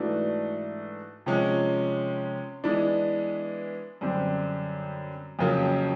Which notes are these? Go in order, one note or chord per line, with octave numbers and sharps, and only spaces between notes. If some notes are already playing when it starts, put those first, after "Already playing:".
Already playing: G#2 E3 A3 D4 F#4
C3 F3 G#3 C#4
E3 G#3 B3 D4
F#2 D3 G3 C4
F2 C#3 F#3 A#3